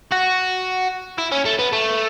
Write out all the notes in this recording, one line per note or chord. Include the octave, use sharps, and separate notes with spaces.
F#4
E4
C#4
A3
B3
A3